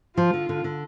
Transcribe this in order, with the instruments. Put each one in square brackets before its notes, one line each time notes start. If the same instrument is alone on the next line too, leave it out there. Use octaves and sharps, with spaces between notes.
[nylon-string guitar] F3 [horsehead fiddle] F4
[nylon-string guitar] D3
D3
D3